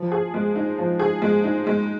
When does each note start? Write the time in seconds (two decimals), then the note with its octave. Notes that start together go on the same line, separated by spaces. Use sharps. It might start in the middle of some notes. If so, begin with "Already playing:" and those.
Already playing: F3
0.12 G#4
0.34 G#3
0.56 D#4
0.78 F3
0.99 G#4
1.22 G#3
1.44 D#4
1.67 G#3